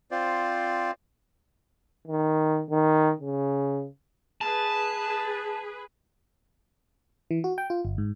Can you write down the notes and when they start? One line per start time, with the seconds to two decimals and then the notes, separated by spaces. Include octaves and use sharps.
0.11 C4 F4 C5 D5
2.08 D#3
2.71 D#3
3.20 C#3
4.41 G#4 B4 A5
7.31 E3
7.44 F#4
7.58 G5
7.70 F4
7.85 G1
7.98 G#2